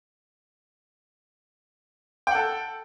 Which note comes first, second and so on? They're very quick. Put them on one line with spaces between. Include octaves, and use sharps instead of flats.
G5 F#5 A4